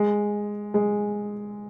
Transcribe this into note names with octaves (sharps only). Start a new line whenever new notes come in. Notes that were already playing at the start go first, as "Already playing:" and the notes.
Already playing: G#3
G#3